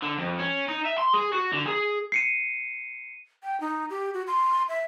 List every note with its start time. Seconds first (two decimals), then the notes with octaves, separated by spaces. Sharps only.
0.02 D3
0.18 F2
0.39 C#4
0.68 D#4
0.85 E5
0.98 C6
1.14 G#4
1.33 F#4
1.53 D3
1.68 G#4
2.12 C7 C#7 D#7
3.43 G5
3.60 D#4
3.90 G4
4.14 F#4
4.27 C6
4.69 E5